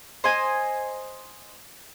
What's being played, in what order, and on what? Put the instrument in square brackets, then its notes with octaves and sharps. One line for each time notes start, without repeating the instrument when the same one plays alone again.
[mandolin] C5 D#5 G#5